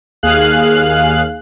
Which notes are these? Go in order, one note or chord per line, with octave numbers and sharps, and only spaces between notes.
D#2 G#4 F5 F#6